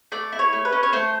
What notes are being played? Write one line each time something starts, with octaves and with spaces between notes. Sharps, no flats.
A3 D5
E4
C#5
A3
B4
C#4
C#5
A3 C5